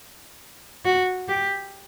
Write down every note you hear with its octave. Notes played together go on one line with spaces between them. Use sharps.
F#4
G4